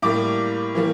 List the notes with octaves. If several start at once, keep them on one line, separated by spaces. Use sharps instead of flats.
A2 G3 A#3 D6
E3 G3 A#3